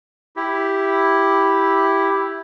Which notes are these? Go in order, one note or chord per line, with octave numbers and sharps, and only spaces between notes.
E4 G4